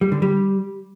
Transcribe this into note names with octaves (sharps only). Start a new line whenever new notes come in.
G3
D3
G3